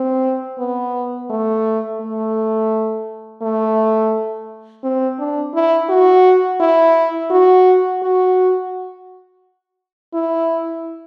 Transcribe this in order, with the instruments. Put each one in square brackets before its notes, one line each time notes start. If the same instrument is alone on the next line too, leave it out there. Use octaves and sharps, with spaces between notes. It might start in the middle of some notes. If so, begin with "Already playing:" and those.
Already playing: [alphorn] C4
B3
A3
A3
A3
C4
D4
E4
F#4
E4
F#4
F#4
E4